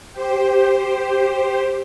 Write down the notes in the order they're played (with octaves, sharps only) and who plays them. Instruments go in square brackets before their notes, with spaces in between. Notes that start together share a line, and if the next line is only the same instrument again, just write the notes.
[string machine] G4 C5